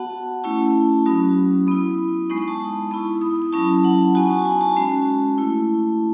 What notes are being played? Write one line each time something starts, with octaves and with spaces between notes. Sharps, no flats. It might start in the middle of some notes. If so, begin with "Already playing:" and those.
Already playing: B3 F#4 F#5 A5
A3 C#4 E4 A5 C#6
F#3 C#4 F#4 B5 D#6
B3 E4 B5 D#6
G#3 B3 D#4 C#6
D#6
A5 C#6
B3 E4 B5 D#6
B5 D#6
B5
F#3 C#4 E4 A5 C#6
F#5 A5
B3 D#4 F#4 G#5 B5
A5 C#6
G#5 B5
A5 C#6
G#3 C#4 F#4
A3 E4